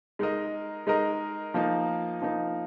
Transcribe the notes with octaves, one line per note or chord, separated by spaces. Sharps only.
G#3 D#4 A#4 D#5
G#3 D#4 A#4 D#5
F3 A#3 D#4
F3 A#3 D#4